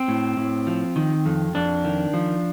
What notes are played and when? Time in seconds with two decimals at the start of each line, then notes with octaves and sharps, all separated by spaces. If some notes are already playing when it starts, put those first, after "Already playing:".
Already playing: C4
0.08 A2
0.37 A2
0.67 F3
0.96 D#3
1.26 F2
1.55 F2 D4
1.85 D#3
2.14 F3